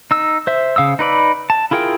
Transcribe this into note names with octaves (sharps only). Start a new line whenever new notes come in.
D#4 E6
C5 E5
C#3 F5 D#6 E6
D#4 B4 D5 B5
A5
E4 F4 G#4 A#4 G5